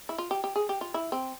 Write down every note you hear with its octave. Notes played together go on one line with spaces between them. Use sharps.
E4
F4
G4
G4
G#4
G4
F4
E4
C4